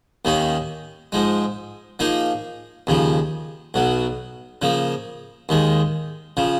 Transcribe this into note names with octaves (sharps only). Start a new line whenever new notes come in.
D#2 D#3 A#3 C#4
G#2 F3 G#3
F3 A#3 D#4 G#4
D#2 C#3 F3
B1 B2 F#3
C#3 F3 A#3
D#2 D#3 G#3
C#3 F3